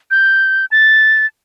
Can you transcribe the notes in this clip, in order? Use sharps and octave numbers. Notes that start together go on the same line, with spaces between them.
G6
A6